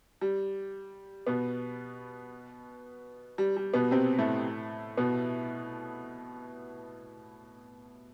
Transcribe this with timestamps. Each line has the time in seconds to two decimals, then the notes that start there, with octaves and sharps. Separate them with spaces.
0.21 G3
1.27 B2 B3
3.38 G3
3.57 G3
3.74 B2 B3
3.91 C3 C4
4.19 A2 A3
4.97 B2 B3